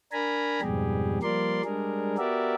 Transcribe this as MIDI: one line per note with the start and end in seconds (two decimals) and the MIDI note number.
0.13 0.60 62
0.13 0.60 70
0.13 0.60 80
0.13 0.60 82
0.13 0.60 83
0.61 1.19 41
0.61 1.19 44
0.61 1.19 47
0.61 1.19 55
0.61 1.19 67
0.61 1.19 68
1.23 1.62 53
1.23 1.62 55
1.23 1.62 58
1.23 1.62 70
1.23 1.62 74
1.23 1.62 84
1.65 2.17 55
1.65 2.17 56
1.65 2.17 62
1.65 2.17 68
1.65 2.17 70
2.18 2.55 59
2.18 2.55 66
2.18 2.55 67
2.18 2.55 70
2.18 2.55 74
2.18 2.55 76